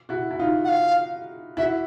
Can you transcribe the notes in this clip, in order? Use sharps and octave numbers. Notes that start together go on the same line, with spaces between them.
E4 F#4
E4
D#4 F4
F#5
F5
E4 F#4 E5